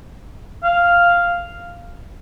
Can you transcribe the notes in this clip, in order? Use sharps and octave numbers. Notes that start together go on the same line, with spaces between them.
F5